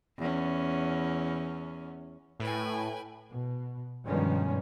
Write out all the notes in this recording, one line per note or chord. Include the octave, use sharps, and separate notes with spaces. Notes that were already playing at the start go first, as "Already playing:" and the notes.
E2 C#4
A2 B4 G5 G#5
B2
G2 B2 D#3 F3 G#3 C#4